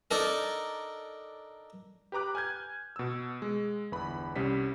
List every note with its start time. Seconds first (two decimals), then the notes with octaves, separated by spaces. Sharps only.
0.11 D4 D#4 A4 A#4
2.12 G4 B4 A#5 D6 F#6
2.35 G#5 F6 G6 G#6
2.96 B2 E6
3.42 G#3
3.91 G1 E2 B4 B5
4.36 C2 G3 C#4 B6